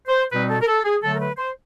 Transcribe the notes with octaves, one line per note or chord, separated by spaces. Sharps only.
C5
B2 G3 C4 D#4 B4
A4
A#4
A4
G#4
D3 F#3 A3 A4
A#4
B4
C5